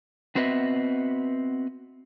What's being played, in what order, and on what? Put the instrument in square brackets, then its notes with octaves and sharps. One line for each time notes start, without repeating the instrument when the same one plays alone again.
[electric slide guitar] B3 C4 F#4 B4 D#5 E5